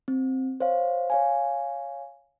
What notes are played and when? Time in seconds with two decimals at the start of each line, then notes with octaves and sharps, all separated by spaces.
0.08 C4
0.60 C5 C#5 F5
1.10 C#5 F5 G#5